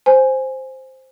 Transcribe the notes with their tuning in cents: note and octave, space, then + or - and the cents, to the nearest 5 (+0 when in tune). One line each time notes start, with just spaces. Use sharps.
C5 +0 G#5 +0